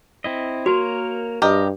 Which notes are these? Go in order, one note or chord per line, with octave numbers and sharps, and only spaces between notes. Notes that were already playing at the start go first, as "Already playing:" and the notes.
C4 E4 D#5
A#3 F#4 A#4 C#5
G2 G4 A#4 D#5